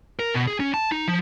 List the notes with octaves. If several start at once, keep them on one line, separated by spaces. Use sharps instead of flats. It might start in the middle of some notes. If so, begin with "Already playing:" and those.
A#4
B2
G#4
C#4
A5
D#4
F3